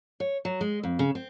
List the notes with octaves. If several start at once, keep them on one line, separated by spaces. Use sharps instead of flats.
C#5
F#3
G#3
F2
C#3
C4